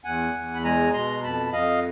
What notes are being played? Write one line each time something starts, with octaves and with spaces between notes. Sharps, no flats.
E2 F#5 G#5
E2
B5
G#3 G#5 A#5
B2 A#5 C6
F2 A5 B5
F2 D#5 F5